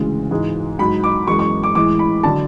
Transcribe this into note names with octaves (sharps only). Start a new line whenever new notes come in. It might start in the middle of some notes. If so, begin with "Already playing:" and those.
Already playing: D2 C#3 E3 G#3
G#2 E3 G#3
G#2 F#3 B5
D6
F#2 E3 G#3 C#6
C#6
D6
A2 E3 G#3 D6
B5
D3 F#3 A5